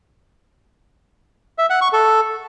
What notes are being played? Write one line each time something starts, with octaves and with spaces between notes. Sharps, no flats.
E5
F#5
C#6
A4